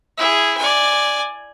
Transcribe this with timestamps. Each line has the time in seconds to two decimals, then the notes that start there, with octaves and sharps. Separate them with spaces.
0.18 E4 G#4
0.58 D5 G#5